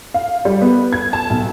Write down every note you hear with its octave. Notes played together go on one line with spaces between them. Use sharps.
F5
G3
B3
G#6
A5
B1